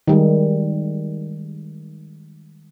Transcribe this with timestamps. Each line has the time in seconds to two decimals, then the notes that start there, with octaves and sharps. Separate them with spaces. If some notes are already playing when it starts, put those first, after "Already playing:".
0.08 D#3 G3 G#3